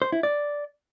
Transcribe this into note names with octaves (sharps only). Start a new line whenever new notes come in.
C5
E4
D5